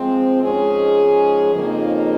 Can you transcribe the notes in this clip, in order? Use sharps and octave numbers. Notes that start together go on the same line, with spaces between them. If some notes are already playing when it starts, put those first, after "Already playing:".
Already playing: F3 G#3 C4
G#2 F3 G#3 C#4 G#4
F2 C#3 F3 A#3 D#4